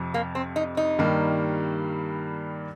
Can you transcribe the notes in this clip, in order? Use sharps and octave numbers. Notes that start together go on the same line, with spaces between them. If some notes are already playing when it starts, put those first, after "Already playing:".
Already playing: F2 C3 F3
A#3
C4
D#4
D#4
G2 D#3 G3 A#3